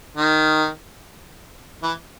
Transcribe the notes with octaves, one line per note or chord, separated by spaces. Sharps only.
D#3
E3